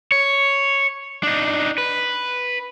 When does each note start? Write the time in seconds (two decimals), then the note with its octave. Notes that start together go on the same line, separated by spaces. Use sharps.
0.12 C#5
1.23 D4 D#4
1.78 B4